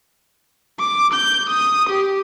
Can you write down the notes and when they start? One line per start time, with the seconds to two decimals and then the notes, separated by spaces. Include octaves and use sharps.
0.79 D6
1.14 G6
1.50 D#6
1.90 G4